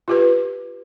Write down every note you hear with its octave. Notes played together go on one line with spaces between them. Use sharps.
F4 G4 B4